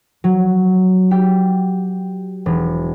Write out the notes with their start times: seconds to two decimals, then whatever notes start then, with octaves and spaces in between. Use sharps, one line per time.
0.24 F#3
1.11 G4
2.46 E1